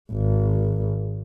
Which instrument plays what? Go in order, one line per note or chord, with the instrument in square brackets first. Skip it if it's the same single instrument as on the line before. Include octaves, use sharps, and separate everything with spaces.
[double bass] G#1